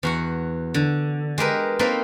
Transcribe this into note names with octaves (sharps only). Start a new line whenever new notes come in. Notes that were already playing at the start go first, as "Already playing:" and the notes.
E2 F#4 F#5
D3
G#3 G4 A#4 B4
A#3 C4 D#4 A4 B4 E5